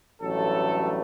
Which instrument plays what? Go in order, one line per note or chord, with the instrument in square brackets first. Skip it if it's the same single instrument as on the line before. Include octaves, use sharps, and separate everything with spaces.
[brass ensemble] A1 G2 F#3 A3 A4